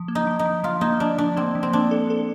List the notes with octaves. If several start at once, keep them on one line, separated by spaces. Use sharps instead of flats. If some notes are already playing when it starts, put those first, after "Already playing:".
Already playing: F3
A#3
D#4
F3
D#4
F3
F3 F4
A#3 D#4
F3 D4
F3 D4
A#3 C4
F3
C4
A#3 D4
A4
A4